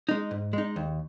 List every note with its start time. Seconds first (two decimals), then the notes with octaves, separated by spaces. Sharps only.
0.09 G#3 D#4
0.31 G#2
0.53 G#3 D#4
0.76 D#2